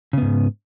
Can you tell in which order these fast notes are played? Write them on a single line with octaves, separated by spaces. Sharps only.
C#3 B3 G#2